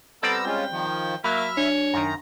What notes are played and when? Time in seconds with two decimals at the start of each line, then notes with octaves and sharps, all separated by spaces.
0.23 G3 B3 C4 A4 D5 A#5 E6
0.45 G#3 C#4 F4 G5
0.71 D#3 F3
1.24 F#3 A#3 E5 B5 F6
1.57 D4 C#5
1.94 F#2 D#3 A#5